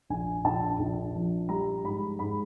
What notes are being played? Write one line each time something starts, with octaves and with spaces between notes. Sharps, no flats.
A#1 G#5
A#1 A5
A#1
F3
G3 A#5
G#2 B5
G#2 B5